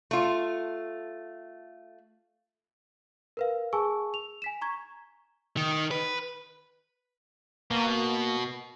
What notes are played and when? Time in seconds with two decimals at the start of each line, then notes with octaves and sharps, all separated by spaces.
0.11 A3 F4
3.37 A#4 B4 F5
3.73 G#4 G#5 A5 C#6 E6
4.14 F7
4.42 G#5 B6 E7
4.61 A#5 C#6 G#6
5.57 D#3
5.91 B4
7.71 B2 A#3